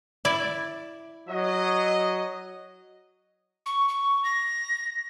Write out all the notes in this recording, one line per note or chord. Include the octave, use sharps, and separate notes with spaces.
E4 D5
F#3 D#5
C#6
C#6
A#6